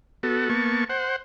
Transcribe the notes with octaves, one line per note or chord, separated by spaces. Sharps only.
B3 F#4 A4
A#3 B3 A5 C#6
C5 F#5